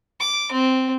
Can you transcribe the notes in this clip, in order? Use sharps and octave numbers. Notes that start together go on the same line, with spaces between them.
D6
C4